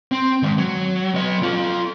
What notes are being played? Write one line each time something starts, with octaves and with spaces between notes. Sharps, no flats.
C4
D#3 G#3
F#3
F#3 D#5
F4 A4